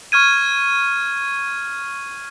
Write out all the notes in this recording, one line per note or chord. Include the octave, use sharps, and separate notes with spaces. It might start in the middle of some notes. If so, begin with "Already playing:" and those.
C#6 F6 G#6 D#7